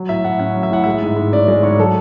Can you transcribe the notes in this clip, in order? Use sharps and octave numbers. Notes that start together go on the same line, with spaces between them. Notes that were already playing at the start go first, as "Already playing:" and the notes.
Already playing: F#3
A2 E5
A2 F#5
C#4 F#5
F#3
E5
A2 F#5
G#3 E5
G#2
G#2
C#4 D5
G#3 D5
G#2 C#5
F#3 A4